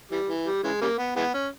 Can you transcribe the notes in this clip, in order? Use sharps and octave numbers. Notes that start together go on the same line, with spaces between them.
E3 G3
E3
G3
C#3 E3 G#3
C#3 G3 A#3
B3
E3 G#3 B3
C#4